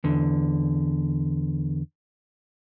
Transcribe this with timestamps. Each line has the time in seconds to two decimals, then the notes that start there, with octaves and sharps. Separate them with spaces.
0.04 E2 D3